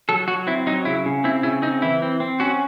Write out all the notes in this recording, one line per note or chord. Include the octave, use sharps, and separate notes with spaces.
F#3 A4
F#3 F#4
C4 E4
F#3 D#4
C#3 E4
C#3
C4 E4
C#3 E4
C4 D#4
E3 E4
C4
C4
C#4 F#4